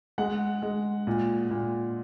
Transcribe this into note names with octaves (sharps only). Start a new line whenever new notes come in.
G#3 F#5
G#3
A#2
A#2